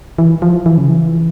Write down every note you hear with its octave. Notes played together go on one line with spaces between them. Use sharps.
E3
F3
E3
C#3
E3